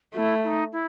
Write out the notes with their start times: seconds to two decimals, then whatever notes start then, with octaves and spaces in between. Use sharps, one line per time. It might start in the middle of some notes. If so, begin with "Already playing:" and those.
0.14 A3 E4 F#4
0.44 E4
0.47 D#4
0.73 E4